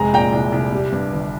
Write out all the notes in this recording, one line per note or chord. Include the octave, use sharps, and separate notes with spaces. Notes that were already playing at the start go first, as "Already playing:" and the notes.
Already playing: F1 G#3 A#5
A#2 G5 A#5
C2
C2
G3
G2
G1